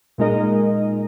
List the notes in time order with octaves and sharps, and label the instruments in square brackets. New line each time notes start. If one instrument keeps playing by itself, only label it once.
[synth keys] A#2 G#3 D#4 A#4 D#5